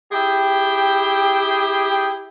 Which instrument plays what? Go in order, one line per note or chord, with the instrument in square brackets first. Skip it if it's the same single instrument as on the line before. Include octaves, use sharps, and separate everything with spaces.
[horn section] E4 G4 G#4 G5